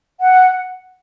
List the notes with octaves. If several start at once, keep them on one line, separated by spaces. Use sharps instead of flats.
F#5